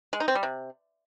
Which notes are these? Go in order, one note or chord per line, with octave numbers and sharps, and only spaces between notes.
G#3
D#4
C4
G3
C3